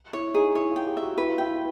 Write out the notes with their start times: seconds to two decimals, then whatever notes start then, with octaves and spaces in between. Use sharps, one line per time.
0.13 E4 C#5
0.34 D#4 G#4
0.55 E4 C#5
0.71 F4
0.76 G5
0.87 G4
0.97 E5
1.02 F#4
1.17 E4 B4
1.29 F4
1.38 E4 G5